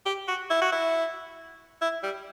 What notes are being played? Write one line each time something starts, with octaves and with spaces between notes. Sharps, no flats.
G4
F#4
E4
F#4
E4
E4
G3